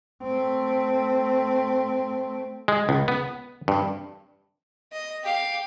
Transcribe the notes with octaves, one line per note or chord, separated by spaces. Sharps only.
A3 C4
G#3
C#2
B3
G2
D#5
G4 F5